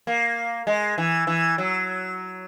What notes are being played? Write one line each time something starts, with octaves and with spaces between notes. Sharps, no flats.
A#3
G#3
E3
E3
F#3